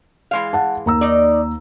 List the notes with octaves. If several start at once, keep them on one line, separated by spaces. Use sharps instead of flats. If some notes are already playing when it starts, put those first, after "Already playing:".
E3 G#3 F5
F#5 A5
D#2 A#5 E6
D#4 D5